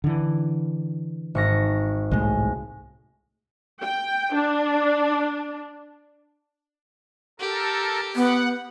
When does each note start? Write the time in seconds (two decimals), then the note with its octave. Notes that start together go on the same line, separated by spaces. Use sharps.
0.04 D3 E3
1.35 G#1 C#6 A#6
2.11 C2 A2 G#3
3.82 G5
4.34 D4
7.40 G4 A4 A#4
8.16 B3 F#5